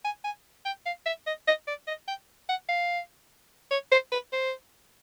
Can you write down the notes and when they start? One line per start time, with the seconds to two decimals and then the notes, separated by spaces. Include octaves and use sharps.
0.04 G#5
0.24 G#5
0.65 G5
0.86 F5
1.06 E5
1.26 D#5
1.47 D#5
1.67 D5
1.87 D#5
2.08 G5
2.49 F#5
2.69 F5
3.71 C#5
3.92 C5
4.12 B4
4.32 C5